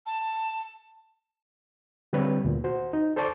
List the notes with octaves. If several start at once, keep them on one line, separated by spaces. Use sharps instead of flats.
A5
D3 G3 C4 D4 B4 C#5
D2 A#2
F#4 C5
D#4
A4 C5 D5 A5 C#6 D6